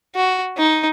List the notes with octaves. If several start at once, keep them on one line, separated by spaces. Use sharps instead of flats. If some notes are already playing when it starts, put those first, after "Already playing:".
F#4
D#4